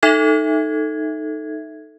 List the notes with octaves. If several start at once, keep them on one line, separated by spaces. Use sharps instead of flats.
D#4 A4 E5 G#6